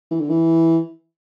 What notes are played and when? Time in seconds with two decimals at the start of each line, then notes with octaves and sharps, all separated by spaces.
0.11 E3
0.20 D3
0.29 E3